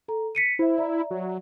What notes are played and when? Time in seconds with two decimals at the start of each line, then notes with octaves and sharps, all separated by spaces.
0.08 A4 A#5
0.35 B6 C#7 D#7
0.59 E4 C5 E5
0.78 D5 E5 A#5
1.11 F#3